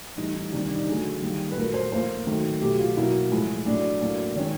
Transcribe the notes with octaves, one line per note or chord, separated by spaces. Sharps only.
A2 E3 G3 D#4
D#4
C3 D#3 G3 D4
D4
D#4
D3 F#3 A3 G#4
D#3 G3 A#3
B4
A#2 F#3 A3 A#4
C5
A2 F3 A#3 C5
D#3 F#3 A3
B2 F#3 A3 G4
F4
B2 F#3 A#3 E4
A2 F3 G#3
A2 F#3 A3 D4
A2 F#3 A#3
D#3 G#3 C#4